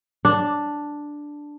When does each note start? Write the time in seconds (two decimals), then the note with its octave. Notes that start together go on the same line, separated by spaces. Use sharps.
0.25 D4